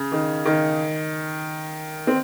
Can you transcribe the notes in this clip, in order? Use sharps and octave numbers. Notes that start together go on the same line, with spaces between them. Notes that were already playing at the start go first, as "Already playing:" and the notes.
Already playing: C#3
D#3
D#3
C4